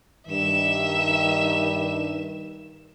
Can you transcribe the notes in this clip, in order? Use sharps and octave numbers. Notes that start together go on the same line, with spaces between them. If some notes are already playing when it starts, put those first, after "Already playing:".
G2 D#3 E5 E7